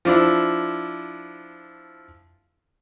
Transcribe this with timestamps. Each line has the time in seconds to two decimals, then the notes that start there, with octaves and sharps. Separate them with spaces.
0.05 F3 D4 E4